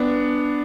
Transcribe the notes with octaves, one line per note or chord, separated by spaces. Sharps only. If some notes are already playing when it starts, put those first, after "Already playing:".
Already playing: B3 D4